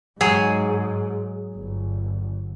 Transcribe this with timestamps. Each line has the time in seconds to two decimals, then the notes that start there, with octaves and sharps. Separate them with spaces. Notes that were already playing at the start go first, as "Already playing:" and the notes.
0.21 G#2 F#3 G#4
1.56 G1